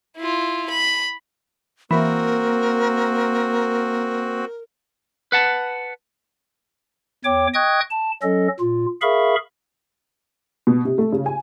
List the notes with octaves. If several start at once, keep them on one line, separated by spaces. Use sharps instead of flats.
E4 F4
B5
E3 A#3 C4 F#4 A#4
B4 F#5 A5
E2 C#5 G5 D6
D#5 G5 C#6 D#6 F#6 G#6
A5
F#3 C#4 A4 D#5
A#2 F4
G#4 A#4 E5 F5 B5 C#6
B2
C3
A3
C#3
G#5